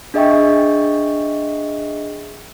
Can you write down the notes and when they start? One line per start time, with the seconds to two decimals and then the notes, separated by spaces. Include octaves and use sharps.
0.14 D4 G#4 D#5 E5 G5 C#6